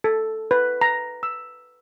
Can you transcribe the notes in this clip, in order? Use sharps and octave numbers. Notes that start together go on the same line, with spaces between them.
A4
B4
A#5
E6